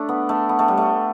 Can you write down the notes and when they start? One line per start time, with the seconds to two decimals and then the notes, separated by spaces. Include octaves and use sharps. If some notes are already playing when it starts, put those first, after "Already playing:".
Already playing: A3 D4
0.09 B3
0.29 A3
0.49 B3
0.59 A3
0.68 G3
0.77 A3